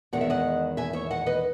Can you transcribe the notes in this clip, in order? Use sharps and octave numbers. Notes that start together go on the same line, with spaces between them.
E2 D#3 G#3 F#5
E5
D#5 F#5
E5 G#5
C#5 E5
D#5 F#5
B4 D#5